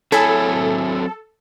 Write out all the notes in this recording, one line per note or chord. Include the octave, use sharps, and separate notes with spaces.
F#3 C4 E4 G#4 A4 C#5